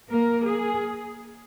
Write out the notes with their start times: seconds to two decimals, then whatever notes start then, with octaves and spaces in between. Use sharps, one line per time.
0.10 A#3 A#4
0.46 G#4